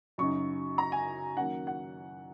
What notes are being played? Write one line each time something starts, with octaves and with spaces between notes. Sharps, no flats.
F#2 C#3 F#3 D#4 C#6
A#5
G#5
D#3 F#3 A#3 C#4 F#5
F#5